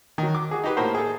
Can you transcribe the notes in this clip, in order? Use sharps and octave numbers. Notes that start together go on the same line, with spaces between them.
D#3 F#3
D6
F#4 G#4
D#4 F#4 G4 B4
A2 A#3 F#4 A#4 C5 B5
G#4 A4